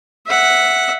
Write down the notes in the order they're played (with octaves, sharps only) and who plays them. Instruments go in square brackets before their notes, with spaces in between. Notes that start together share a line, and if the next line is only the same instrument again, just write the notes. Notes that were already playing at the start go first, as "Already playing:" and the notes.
[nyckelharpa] E5 F#5